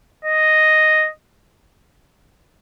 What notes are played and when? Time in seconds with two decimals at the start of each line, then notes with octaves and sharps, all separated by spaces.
0.25 D#5